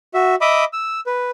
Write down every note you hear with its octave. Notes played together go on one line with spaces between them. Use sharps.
F#4 E5
D#5 E5 B5 D6 D#6
E6
B4